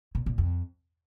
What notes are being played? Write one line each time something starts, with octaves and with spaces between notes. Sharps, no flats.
A#2
A#2
F2